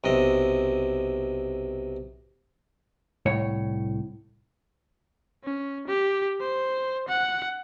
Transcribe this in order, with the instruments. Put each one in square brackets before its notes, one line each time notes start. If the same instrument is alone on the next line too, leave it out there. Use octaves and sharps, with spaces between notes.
[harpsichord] B1 C3 D#5
[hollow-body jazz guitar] C2 A2 C#5
[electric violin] C#4
G4
C5
F#5